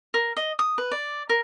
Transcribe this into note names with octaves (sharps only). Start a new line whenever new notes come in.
A#4
D#5
D#6
B4
D5
A#4